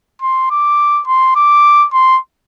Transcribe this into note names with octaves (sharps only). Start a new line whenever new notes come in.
C6
D6
C6
D6
C6